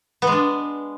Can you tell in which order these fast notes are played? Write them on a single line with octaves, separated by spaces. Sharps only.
B3 G#3 D4